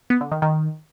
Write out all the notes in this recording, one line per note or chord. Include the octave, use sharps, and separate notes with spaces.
B3
D3
D#3
D#3